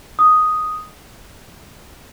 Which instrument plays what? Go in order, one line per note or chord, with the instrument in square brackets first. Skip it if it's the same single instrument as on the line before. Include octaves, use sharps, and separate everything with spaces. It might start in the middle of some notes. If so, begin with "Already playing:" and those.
[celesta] D#6